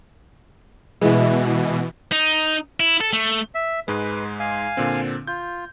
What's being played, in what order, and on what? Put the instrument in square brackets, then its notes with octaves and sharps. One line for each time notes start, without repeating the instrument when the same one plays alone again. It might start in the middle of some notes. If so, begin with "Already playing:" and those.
[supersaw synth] B2 E3 [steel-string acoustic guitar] G#3 E4 F#4
[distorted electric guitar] D#4
E4
A4
A3
[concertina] E5
[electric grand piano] G#2 G#3 [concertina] B4
[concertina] F5 G#5
[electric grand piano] A#2 D3 C4
[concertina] F4 [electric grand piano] G6